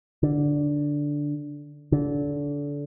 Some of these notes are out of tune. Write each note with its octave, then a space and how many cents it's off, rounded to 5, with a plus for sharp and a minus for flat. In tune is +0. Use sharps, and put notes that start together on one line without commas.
D3 -5
D3 -25